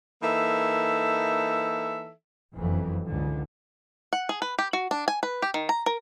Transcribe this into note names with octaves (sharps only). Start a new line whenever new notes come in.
E3 A#3 D#4 A4 E5
F#1 F2 E3 F#3
C#2 G#2 D3
F#5
G#4
B4
G4
F#4
D4
G#5
B4
G4
D#3
A#5
A#4